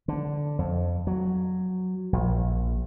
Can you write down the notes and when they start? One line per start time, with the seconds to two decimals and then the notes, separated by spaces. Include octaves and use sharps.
0.08 D3
0.59 F2
1.07 F#3
2.13 A#1